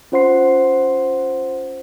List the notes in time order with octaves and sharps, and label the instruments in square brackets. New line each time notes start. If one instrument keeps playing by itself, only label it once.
[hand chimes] C#4 F4 C5 F#5 C6 C7